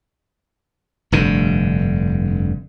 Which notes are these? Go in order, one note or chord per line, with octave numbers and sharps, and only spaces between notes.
F1 G2 D3